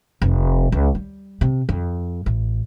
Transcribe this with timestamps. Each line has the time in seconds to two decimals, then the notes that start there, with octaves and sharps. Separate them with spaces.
0.22 F1
0.72 C#2
0.95 G3
1.41 C3
1.69 F2
2.26 A1